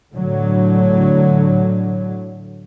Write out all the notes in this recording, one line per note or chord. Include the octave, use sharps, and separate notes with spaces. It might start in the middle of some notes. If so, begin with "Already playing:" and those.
A2 D3 F#3